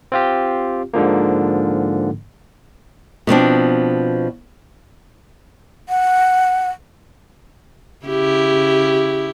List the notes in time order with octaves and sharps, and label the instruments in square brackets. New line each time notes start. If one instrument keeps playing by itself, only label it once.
[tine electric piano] C4 F4 G4
G#2 D3 F3 A#3
[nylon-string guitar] B2 F3 C4 D4
[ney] F#5
[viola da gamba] C#3 E4 G4